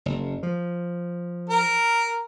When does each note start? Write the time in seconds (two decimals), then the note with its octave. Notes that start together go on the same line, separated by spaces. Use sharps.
0.06 F#1
0.43 F3
1.49 A#4